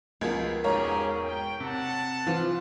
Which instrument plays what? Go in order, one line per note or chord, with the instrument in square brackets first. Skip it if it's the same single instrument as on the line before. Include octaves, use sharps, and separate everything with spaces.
[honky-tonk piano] C#2 F3 [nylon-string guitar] A#3 B3 [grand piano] G#6
[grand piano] E1 G#2 F5 [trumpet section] C#4 G4 G#4 [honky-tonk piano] A#4 C#5
[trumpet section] G5
[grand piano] C3 [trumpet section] F#5 A5
[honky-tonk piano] E3 [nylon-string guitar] F3 F4